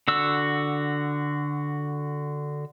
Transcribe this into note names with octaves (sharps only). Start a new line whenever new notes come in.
D3 F#4 E6